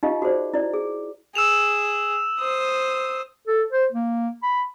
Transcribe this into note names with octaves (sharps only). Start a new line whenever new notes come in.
D#4 F4 G4 D#5 F5
F#4 G#4 C5 D5
E4 D5
G#4
G#4 E6 E7 F7
C5 D#6
A4
C5
A#3
B5